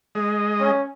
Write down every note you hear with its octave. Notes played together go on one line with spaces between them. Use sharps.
G#3 D#5
C#4